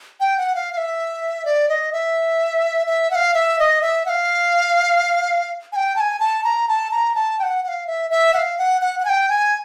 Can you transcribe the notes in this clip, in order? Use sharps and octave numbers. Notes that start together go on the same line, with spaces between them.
G5
F#5
F5
F5
E5
D5
D#5
E5
E5
F#5
F5
E5
D#5
E5
F#5
F5
G#5
G5
A5
G#5
A5
A#5
A5
A#5
A5
G5
F#5
F#5
F5
E5
E5
F#5
F5
F#5
F#5
F#5
G#5
G5
G#5